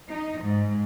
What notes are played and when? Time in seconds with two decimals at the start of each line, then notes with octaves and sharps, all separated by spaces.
0.10 D#4
0.44 G#2